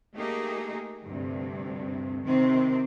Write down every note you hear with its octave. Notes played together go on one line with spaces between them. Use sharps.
A3 A#3 D#4 G4 G#4
D2 G2 C3
C3 D#3 C4